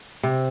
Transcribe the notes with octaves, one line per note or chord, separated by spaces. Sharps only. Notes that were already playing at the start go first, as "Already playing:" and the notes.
C3